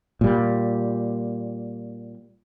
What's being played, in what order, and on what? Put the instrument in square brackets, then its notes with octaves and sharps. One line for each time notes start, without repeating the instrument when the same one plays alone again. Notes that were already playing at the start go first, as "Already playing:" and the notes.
[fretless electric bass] A#2 G3